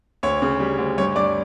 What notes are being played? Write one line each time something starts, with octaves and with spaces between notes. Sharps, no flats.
D2 C#5 C#6
C#3
G3
D2
G2 C#5 C#6
G2 D5 D6